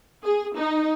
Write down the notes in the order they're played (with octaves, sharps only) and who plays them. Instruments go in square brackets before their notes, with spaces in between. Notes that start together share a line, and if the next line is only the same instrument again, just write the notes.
[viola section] G#4
D#4